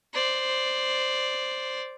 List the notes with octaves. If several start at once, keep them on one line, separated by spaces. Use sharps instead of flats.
C5 D5